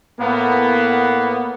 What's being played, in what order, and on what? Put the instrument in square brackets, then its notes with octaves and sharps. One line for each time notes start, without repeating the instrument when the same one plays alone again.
[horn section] A2 A#3 B3